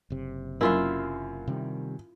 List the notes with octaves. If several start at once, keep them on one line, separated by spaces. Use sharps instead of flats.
F#1 C3
F#2 A#3 E4 F4 E5
C3 D#3 G3